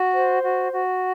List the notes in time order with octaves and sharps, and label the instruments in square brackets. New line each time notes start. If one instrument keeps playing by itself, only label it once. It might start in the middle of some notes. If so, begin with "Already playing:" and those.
Already playing: [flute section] F#4
C5
F#4
F#4